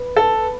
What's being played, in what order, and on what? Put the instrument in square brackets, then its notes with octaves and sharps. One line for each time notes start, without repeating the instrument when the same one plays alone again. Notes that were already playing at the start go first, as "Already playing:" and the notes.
Already playing: [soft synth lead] B4
[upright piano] A4